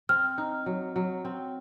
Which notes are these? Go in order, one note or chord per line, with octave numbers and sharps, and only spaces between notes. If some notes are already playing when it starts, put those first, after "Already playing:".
C4 F6
D#4
F#3
F#3
C4